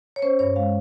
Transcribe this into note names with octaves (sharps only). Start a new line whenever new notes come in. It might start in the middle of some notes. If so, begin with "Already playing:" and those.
C#5
C#4 C5
G2 C#5
G#3 F5